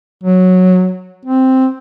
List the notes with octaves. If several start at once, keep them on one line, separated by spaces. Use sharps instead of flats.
F#3
C4